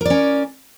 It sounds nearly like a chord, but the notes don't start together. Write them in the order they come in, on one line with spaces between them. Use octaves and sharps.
A#4 D5 C#4